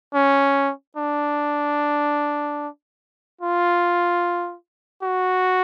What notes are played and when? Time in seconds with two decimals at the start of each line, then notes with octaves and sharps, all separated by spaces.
0.14 C#4
0.97 D4
3.41 F4
5.03 F#4